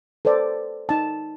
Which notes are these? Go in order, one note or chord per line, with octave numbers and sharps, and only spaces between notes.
A4 B4 C5 D5
D#4 A5